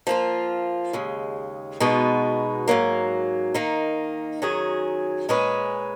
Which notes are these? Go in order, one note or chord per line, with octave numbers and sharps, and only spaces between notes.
F3 A#3 F4
D#2 C#3 G#3
B2 G#3 B3 D#4 F#4
G#2 F#3 A#3
D#3 A#3 D#4
F#2 D#3 F#3 C#4 G#4
A#2 G#3 C#4 G#4 B4